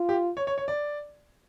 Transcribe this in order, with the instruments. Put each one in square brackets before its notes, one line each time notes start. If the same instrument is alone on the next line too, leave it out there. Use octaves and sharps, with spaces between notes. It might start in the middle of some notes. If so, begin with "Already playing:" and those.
Already playing: [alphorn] F4
[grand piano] G4
C#5
C#5
C#5
D5